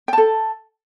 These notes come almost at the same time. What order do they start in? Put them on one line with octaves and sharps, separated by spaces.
G5 A5 A4